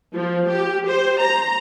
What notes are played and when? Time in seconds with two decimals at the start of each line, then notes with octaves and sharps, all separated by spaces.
0.15 F3
0.49 G4
0.90 C5
1.23 A#5